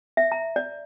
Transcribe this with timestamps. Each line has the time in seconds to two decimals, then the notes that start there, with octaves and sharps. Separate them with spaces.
0.17 E5
0.32 A#5
0.56 D5